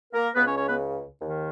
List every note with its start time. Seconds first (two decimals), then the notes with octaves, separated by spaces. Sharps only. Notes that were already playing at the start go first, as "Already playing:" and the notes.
0.13 A#3 A#4
0.35 C#2 C#3 B3 B4
0.45 C#4 C#5
0.56 C#4 C#5
0.66 B3 B4
1.20 D#2 D#3